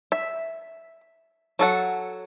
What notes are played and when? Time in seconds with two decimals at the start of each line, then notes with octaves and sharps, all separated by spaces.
0.12 E5
1.59 F#3 A4 F#5